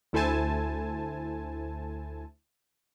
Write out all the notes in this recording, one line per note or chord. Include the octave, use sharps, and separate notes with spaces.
D2 E4 A4 C5 G#5 A5